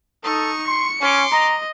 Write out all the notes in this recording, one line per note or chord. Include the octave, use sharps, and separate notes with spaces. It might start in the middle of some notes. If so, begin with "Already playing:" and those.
D#4 A4 C#6 D#6
C6 C#7
C#4 C6 D6
D#5 A#5